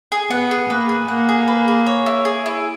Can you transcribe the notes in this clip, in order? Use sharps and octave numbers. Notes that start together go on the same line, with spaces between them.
G#4
B3 F#5
G#4
A#3 B4
G#4
A#3 F#5
G#4
B4
G#4
C#5
E4
G#4
E4